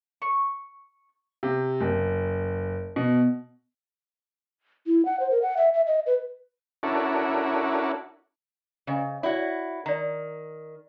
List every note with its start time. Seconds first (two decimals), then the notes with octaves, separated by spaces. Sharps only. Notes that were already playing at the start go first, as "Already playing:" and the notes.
0.22 C#6
1.43 C3
1.81 F#1
2.96 B2
4.87 E4
5.05 F#5
5.20 C5
5.31 A#4
5.42 F#5
5.57 E5
5.73 E5
5.87 D#5
6.06 B4
6.83 C#4 D4 E4 F#4 A4 A#4
8.87 C#3 C5 D#5 G#5
9.23 E4 F#4 C#5 D5
9.86 D#3 D5 A#5